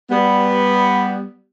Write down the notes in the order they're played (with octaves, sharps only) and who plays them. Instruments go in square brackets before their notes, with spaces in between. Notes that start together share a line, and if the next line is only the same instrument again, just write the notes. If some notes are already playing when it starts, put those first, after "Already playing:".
[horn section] G3 B3